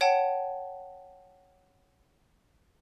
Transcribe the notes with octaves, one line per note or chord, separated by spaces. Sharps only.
C#5 F#5 G5 A5